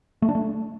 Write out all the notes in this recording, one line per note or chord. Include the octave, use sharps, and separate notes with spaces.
A3
D4
A3